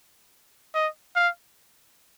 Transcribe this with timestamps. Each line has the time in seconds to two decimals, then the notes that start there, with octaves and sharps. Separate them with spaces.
0.75 D#5
1.16 F5